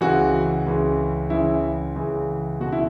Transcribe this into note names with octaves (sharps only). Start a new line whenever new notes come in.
C#2 C#3 E3 F#4
C#2 C#3 E3
C#2 C#3 E3 E4
C#2 C#3 E3
C#2 B2 F#4
E4